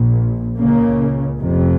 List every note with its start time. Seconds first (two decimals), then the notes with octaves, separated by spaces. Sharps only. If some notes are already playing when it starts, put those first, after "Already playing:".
Already playing: A#1 A#2
0.59 C#2 C#3 A#3
1.39 F1 F2 C3